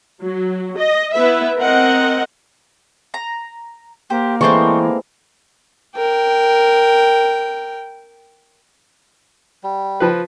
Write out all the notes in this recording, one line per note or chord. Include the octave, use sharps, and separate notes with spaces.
F#3
D#5
B3 E4 B4 E5
C4 A#4 D#5 F#5
A#5
A#3 G4 C5
E3 G#3 A3 C4 C5 D5 C#6
A#4 G5
G3
F3 B4